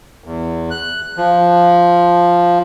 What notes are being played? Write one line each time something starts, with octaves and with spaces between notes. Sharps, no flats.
E2
F#6
F3